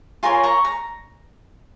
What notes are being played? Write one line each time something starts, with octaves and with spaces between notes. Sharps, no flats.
F4 A#4 C#5 G#5 C6
A#5 C#6
A#5